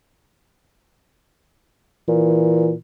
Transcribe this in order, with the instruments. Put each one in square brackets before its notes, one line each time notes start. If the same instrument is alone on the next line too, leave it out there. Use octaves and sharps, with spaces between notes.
[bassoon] A#2 [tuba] E3